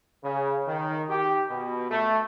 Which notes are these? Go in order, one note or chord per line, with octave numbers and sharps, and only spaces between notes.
C#3
D#3
G4
B2
A3